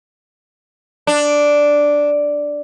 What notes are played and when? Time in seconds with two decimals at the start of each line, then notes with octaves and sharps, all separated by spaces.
1.07 D4